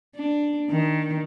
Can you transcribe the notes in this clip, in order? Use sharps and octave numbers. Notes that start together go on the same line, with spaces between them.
D4
D#3